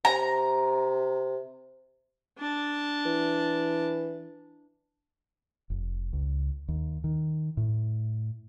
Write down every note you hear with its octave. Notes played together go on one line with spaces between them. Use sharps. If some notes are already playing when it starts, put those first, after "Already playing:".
C3 A#5
D4 A5
E3
F1
C#2
D#2
D#3
A2